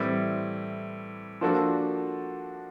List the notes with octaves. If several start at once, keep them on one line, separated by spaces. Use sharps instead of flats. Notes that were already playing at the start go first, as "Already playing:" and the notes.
Already playing: A2 E3 G3 C4 E4
F3 A#3 D4 F#4 A4